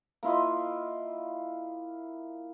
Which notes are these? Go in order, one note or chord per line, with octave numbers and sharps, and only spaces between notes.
A#3 E4 F4 D#5